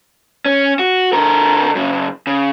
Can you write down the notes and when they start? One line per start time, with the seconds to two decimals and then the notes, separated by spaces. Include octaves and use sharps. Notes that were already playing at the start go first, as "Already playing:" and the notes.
0.46 C#4
0.79 F#4
1.13 D3 A#4
1.75 F#2 C#3
2.27 C#3